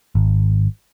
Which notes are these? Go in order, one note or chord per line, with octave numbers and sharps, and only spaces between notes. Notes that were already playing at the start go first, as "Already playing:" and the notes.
G#1